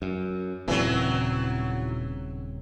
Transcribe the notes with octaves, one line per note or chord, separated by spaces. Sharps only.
F#2
D#1 A#2 C#3 E3 F#3 C4